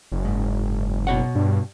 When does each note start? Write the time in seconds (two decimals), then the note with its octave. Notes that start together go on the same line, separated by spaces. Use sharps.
0.12 F#1
0.25 G#2
1.07 B2 C#5 F#5
1.35 G2